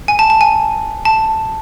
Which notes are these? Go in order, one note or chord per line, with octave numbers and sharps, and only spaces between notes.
G#5
A5
A5
G#5
A5